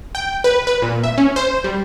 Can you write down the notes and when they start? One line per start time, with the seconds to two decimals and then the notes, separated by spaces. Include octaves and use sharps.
0.15 G5
0.44 B4
0.67 B4
0.82 A#2
1.03 E5
1.18 C#4
1.36 C5
1.64 G3